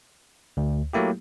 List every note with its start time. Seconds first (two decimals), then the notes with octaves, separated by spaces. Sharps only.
0.57 D2
0.93 F#3 A3 A#3 E4 G4